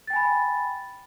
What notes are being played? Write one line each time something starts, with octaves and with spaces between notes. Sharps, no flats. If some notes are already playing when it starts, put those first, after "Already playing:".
G5 G#5 B5 A6